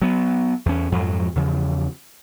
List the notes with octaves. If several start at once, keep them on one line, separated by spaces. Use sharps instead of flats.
F#3 B3
E2 C#4
F2 G#2 F3 F#3
E2 C#3 F3